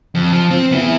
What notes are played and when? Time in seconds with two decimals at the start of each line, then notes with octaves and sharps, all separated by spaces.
0.15 F2
0.33 F3
0.51 C4
0.72 B3 E4